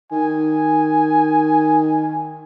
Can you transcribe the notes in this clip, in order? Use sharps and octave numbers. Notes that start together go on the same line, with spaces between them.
D#3 G#5